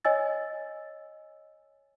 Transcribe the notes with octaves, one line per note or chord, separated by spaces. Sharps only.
C#5 D#5 G#5 E6 A6